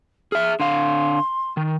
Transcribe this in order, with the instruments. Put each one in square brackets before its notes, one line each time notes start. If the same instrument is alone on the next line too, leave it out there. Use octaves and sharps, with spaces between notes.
[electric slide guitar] G#4 E5 [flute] F6
[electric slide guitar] D3 F5 [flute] C6
[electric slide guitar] D#3